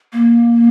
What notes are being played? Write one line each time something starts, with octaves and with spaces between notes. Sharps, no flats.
A#3